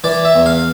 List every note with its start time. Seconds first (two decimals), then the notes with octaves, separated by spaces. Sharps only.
0.04 E3 D5
0.25 E5
0.35 E2
0.46 F5